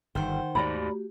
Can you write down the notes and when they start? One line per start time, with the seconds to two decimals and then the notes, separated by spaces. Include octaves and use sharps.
0.15 G1 D#3 C5 F#5 G5
0.55 D#2 G#2 A3 F#4 G4 D5 A#5 B5